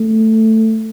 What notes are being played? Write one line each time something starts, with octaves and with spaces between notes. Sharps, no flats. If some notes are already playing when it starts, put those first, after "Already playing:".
Already playing: A3